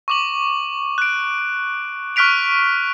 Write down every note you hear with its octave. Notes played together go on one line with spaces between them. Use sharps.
C#6 D6 F#7
F#6 D7
C#6 F6 F#6 B6 D7 F7